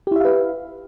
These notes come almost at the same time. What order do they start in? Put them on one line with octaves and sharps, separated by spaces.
G4 E4 E5 F5 B4